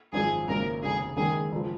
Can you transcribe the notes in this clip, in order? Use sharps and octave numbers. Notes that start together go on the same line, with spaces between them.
G#1 F#2 F3 G#4
G#1 F#2 C#3 F#3 A#3 A#4
F1 D#2 C#3 G#4
F#1 F#2 D#3 G#3 G#4
F#1 F3